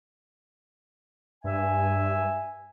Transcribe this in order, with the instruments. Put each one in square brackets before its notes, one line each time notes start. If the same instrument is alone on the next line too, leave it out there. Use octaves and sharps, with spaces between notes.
[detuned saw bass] G2 [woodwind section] E5 G#5